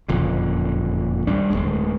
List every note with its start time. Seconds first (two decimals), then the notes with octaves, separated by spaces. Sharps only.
0.08 F#1 F2 A#2 D3
1.27 G#1 G3 D4
1.50 D1 D#2 G#3